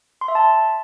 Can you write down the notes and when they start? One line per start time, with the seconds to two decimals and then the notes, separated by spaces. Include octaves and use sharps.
0.21 C6
0.28 E5
0.35 A5